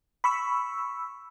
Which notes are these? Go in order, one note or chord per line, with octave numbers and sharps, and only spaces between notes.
B5 C#6 E6